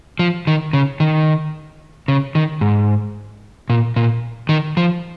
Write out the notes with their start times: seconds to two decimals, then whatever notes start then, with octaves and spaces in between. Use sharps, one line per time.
0.19 F3
0.47 D#3
0.73 C#3
1.00 D#3
2.08 C#3
2.35 D#3
2.61 G#2
3.70 A#2
3.96 A#2
4.49 D#3
4.77 F3